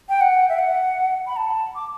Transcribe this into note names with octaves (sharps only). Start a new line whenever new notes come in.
G5
F#5
E5
F#5
B5
A5
D6